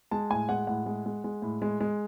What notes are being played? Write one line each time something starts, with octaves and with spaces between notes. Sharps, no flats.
G#3 A5
A2 G#5
G#3 F#5
A2 F#5
G#3
G#3
G#3
A2
G#3
G#3